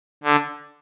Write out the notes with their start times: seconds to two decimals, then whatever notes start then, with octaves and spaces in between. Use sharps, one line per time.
0.24 D3